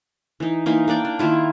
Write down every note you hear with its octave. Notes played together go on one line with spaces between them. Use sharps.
E3 D#4
E3 A#3 D#4 C6
A#3 D4 D5 G5
D4
D#3 A#3 E4 F4